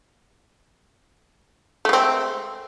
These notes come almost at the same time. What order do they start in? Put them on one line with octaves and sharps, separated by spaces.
A3 G#3 C4